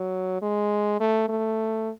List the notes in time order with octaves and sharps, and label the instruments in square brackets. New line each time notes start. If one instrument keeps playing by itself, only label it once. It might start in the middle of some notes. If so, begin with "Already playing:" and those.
Already playing: [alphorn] F#3
G#3
A3
A3